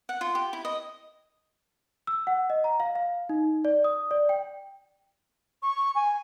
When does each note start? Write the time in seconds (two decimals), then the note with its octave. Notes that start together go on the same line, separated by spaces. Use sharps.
0.09 F#5
0.21 F4
0.35 G4
0.53 E4
0.65 D#5
2.07 E6
2.27 F#5
2.50 D#5
2.64 A#5
2.80 F5
2.96 F5
3.29 D#4
3.65 D5
3.84 D#6
4.11 D5
4.29 G5
5.63 C#6
5.95 G#5